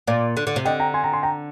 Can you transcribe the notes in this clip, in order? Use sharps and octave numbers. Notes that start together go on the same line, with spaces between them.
A#2 D5 F5
D3
D3
C3
D3 D#5 G5
G5 A#5
G#5 C6
G5 A#5
G#5 C6
G5 A#5